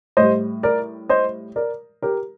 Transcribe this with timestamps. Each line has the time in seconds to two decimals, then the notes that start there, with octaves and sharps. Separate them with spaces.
0.17 A2 G3 C5 D#5
0.63 A#4 D5
1.09 C5 D#5
1.56 A#4 D5
2.02 G4 A#4